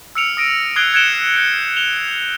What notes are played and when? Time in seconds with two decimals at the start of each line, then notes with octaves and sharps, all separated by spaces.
0.15 E6 F6 C#7 D7 F7
0.37 D#6 A#6 D7 D#7
0.76 D#6 F#6 G#6 C7 D7 G7
0.93 F#6 G#6 C#7 D7 E7 G7
1.36 G6 C#7
1.76 E7 F7 G7